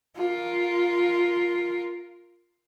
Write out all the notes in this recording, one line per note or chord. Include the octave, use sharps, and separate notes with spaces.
F4 A#4